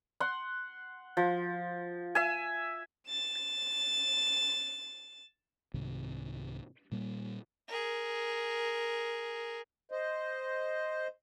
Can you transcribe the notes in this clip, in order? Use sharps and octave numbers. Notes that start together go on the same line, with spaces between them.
F#5 C6
F3
E5 G#5
A6 E7
C2 G#2 C3 D#3
A#2 G3 A#3
G#4 A#4
C5 D#5